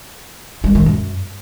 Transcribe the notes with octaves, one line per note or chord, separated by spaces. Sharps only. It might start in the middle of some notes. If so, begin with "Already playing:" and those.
G3
D#3
F#2